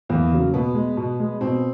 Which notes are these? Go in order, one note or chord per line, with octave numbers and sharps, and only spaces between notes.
E2 A#3
C#3 F#3
B2 B3
G#3
B2
G#3
B2 C4